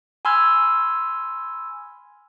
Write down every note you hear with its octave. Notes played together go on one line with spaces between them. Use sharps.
G#5 B5 C6 E6 F6 G#6